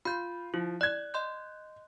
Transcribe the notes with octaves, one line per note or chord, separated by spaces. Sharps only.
F4 B5 G6
F3 E4
D5 F#6 G#6
D#5 C6 G6